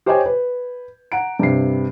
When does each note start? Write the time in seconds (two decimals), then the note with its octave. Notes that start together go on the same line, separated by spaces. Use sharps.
0.06 G4 C5 C#5 D#5 G5 G#5
0.26 B4
1.12 F#5 A#5 D7
1.39 G2 C3 C7